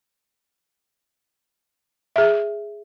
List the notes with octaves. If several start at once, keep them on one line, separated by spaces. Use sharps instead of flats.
G#4 E5